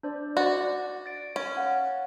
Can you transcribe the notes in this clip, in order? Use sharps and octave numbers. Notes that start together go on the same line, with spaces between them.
D4 C5 D5
F#4 D5
A6 D7
C#4
F5 F#5